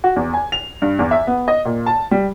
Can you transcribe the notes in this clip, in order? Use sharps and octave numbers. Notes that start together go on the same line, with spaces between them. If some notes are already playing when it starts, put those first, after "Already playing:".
F#4
E2
G#5
F7
G2
E2
E5
B3
D#5
A#2
A5
G3